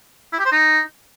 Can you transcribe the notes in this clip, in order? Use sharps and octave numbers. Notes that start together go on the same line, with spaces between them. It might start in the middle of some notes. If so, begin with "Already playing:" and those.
E4
G4
C5
D#4